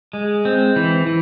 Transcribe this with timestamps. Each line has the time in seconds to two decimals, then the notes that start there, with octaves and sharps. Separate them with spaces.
0.13 G#3
0.45 C4
0.76 E3
1.07 E3